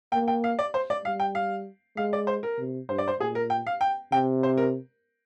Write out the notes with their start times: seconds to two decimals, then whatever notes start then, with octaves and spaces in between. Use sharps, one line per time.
0.12 A#3 G5
0.28 G5
0.44 F5
0.59 D5
0.74 C5
0.90 D5
1.04 G3 F5
1.20 G5
1.35 F5
1.96 G#3 F5
2.13 D5
2.27 C5
2.43 A#4
2.58 C3
2.89 G2 C5
2.98 D5
3.08 C5
3.20 A#2 G#4
3.35 A#4
3.50 G5
3.67 F5
3.81 G5
4.12 C3 G5
4.43 C5
4.57 A#4